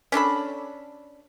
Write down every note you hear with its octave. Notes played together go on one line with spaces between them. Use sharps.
C#4 D4 A4 B5